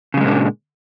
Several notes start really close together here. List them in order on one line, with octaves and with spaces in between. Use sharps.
C#3 G3 G#3 A#2 D4